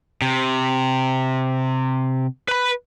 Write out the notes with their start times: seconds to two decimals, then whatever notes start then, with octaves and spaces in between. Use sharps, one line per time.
0.22 C3
2.48 B4 B5